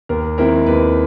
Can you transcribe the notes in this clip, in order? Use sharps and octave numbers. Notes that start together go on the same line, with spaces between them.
D#2 A#4
D#3 G#3 C4 E4 A#4
D#2 B4